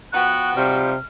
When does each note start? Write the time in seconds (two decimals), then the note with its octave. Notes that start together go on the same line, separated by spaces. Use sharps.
0.12 F3 B3 F#4 G5 F#6
0.57 G#2 C3 F3 G3 F6